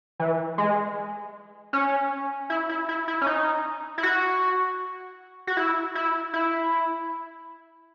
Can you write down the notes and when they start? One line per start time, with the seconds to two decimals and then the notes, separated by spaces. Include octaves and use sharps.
0.19 E3
0.58 G#3
1.73 C#4
2.50 E4
2.69 E4
2.89 E4
3.08 E4
3.21 C#4
3.27 D#4
3.98 E4
4.03 F#4
5.47 F#4
5.57 E4
5.95 E4
6.33 E4